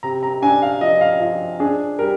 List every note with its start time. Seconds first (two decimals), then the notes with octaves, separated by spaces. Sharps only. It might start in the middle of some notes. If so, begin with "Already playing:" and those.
0.03 C3 A#5
0.23 A#5
0.42 D4 G#5
0.62 F5
0.81 F3 D#5
1.01 F5
1.20 F3
1.60 D4 G#4
1.99 G3 A#4